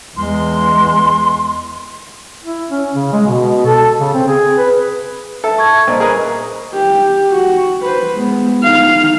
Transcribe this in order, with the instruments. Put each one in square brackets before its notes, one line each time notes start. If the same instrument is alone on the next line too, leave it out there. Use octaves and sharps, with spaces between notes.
[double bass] E2 G#3 [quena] C6
[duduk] E4
C#4
C#3
G#3
B2
A4
C#3
C4
G#4
B4
[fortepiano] A4 [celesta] E5
[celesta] A5 C#6 G#6
[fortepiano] A#2 [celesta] C5 D#5
[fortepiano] G#4 A#4 B4
[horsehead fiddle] G4
F#4
B4 C5
G#3 B3
D#4 F5